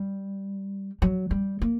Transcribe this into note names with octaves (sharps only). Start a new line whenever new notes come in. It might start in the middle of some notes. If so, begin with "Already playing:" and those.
Already playing: G3
F#3
G3
A#3